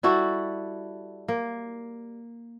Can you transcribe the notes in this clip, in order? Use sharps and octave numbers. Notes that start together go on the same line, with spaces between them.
G3 E4 F#4 A4
A#3